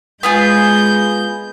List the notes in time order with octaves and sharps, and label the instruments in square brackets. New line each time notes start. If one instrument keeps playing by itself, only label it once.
[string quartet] G#3 G6 [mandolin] B3 F4 G#4